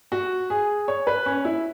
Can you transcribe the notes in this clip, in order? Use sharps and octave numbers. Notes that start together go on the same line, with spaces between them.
F#4
G#4
C#5
B4
C#4
E4